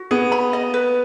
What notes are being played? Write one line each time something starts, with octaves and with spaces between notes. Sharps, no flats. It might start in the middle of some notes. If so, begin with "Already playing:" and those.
Already playing: F#4
B3 G#4
B5
D#5
B4